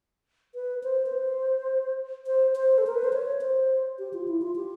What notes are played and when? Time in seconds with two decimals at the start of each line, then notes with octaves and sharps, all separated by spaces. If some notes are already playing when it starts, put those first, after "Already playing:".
0.55 B4
0.83 C5
1.06 B4
1.13 C5
2.27 C5
2.55 C5
2.78 A4
2.87 A#4
2.95 B4
3.04 C5
3.13 C#5
3.41 C5
3.99 G4
4.13 F4
4.28 E4
4.42 F4
4.56 G4